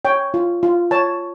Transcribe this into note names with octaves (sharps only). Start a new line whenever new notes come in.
C#5 G5
F4
F4
C#5 A5